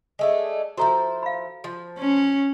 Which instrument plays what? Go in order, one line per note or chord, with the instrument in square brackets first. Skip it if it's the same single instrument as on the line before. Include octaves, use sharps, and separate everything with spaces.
[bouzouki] G#3 A3 D4
[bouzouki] F3 E4 C5 [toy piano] F#4 A4 A#5
[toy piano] F5 B5
[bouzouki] F3
[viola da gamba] C#4